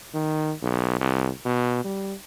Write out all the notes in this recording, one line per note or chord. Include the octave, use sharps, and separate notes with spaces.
D#3
B1
C2
B2
G3